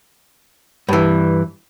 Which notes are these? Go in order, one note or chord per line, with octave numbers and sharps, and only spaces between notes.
G2 E3